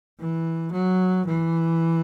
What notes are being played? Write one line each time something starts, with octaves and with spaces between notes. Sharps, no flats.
E3
F#3
E3